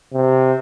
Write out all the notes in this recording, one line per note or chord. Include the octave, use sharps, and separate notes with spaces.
C3